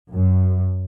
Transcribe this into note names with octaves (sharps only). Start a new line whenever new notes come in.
F#2